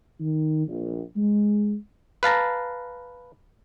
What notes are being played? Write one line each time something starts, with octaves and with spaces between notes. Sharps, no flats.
D#3
A#1
G#3
B4 F5 A5 A#5